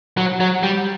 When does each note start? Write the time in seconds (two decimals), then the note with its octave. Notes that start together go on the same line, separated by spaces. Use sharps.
0.17 F#3
0.40 F#3
0.63 G3